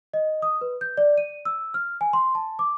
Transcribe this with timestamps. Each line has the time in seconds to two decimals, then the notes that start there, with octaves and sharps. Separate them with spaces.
0.14 D#5
0.42 D#6
0.61 B4
0.81 G6
0.97 D5
1.18 D#7
1.45 E6
1.74 F6
2.01 G#5
2.13 C6
2.35 A5
2.59 D6